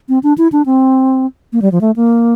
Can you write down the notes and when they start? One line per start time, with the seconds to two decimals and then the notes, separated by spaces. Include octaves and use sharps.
0.09 C4
0.23 D4
0.38 E4
0.52 D4
0.66 C4
1.53 A#3
1.62 G3
1.72 F3
1.81 A3
1.96 A#3